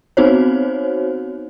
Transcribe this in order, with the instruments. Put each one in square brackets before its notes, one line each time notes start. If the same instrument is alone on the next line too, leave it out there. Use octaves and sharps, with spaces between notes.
[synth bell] B3 C4 D#4 F#4 C5 C#5